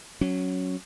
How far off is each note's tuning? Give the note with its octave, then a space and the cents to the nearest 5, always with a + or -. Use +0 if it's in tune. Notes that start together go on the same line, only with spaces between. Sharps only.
F#3 +0 C#4 +0